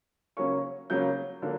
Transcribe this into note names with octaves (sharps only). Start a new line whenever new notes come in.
C#3 F#3 A#3 C#4 C#6
C#3 F#3 A#3 C#4 G6
D3 F#3 A#3